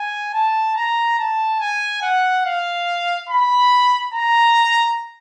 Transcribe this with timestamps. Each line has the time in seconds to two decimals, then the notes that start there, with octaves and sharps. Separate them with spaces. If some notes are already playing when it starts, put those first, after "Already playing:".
Already playing: G#5
0.34 A5
0.75 A#5
1.18 A5
1.60 G#5
2.02 F#5
2.45 F5
3.29 B5
4.14 A#5